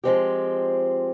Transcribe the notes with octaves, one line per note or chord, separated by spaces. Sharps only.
F3 G#3 C4 G4